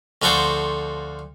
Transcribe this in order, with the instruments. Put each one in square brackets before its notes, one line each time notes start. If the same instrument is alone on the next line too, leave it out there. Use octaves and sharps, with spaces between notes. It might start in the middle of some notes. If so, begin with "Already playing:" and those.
[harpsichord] D2 F3 F#4 A4 C5